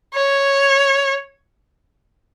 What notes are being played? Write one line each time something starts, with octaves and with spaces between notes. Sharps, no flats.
C#5